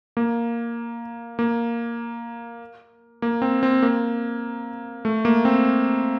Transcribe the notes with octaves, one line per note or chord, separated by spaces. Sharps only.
A#3
A#3
A#3
C4
C4
A#3
A3
A#3
C4